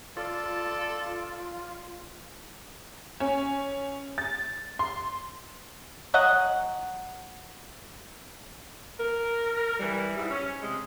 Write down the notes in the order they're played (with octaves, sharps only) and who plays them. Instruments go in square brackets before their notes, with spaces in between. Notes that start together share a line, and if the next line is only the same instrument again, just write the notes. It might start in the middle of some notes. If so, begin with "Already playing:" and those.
[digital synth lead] F4 [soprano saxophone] A4 [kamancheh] D5
[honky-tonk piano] C#4
A6
C6
[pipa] F#3 D#5 F#5
[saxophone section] A#4
E3 G3
G#2 G3 E4
C#4
C3 G#3